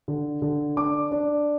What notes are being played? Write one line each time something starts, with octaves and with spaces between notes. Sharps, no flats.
D3
D3
D4 D6
D4